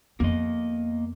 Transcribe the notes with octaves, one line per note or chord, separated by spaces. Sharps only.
F2 A#3 B3 D#5